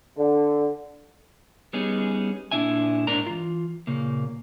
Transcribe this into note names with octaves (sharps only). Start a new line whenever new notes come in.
D3
G3 B3 C#4 D#4 G#4
A#2 G3 D4 E4 E5 G#5
G#2 D4 A#4 A#5
E3 F4
A#2 C#3 A#3